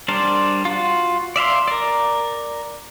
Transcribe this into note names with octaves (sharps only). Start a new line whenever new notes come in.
G3 D4 A#4 C5 D5
F4 F#4
D5 E5 F5 C6
A#4 D5